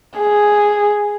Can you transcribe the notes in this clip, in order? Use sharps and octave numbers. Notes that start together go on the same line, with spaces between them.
G#4